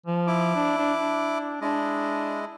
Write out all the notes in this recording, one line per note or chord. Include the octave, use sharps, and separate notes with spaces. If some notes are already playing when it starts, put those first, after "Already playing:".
F3
E4 D6
D4
D4
D4
G#3 D4 E4 D#5